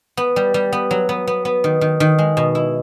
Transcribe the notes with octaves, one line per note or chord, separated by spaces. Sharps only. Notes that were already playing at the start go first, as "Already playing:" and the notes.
B3
G3
G3
B3
F#3
B3
B3
B3
D#3
D#3
D#3
G#3
B2
E4